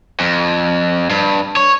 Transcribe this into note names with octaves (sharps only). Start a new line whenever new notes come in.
F2
G2
C#5